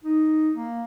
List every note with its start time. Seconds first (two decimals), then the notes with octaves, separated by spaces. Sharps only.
0.04 D#4
0.55 A#3